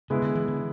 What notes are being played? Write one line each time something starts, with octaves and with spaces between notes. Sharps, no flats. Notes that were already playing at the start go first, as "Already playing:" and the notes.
C#3 G#3 B3 E4
D3
E3
D3